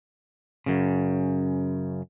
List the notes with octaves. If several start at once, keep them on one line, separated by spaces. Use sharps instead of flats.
F#2 C#3